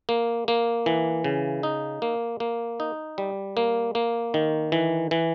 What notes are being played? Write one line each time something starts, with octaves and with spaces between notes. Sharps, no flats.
A#3
A#3
E3
C#3
D#4
A#3
A#3
D#4
G3
A#3
A#3
D#3
E3
E3